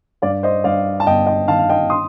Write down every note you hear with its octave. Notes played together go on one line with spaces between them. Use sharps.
G2 D5 F5
C5 D#5
G2 D5 F5
A5
G1 D#5 G5
D#5 G5
D#3 F5 A5
F5
D#5 G5
C6 D#6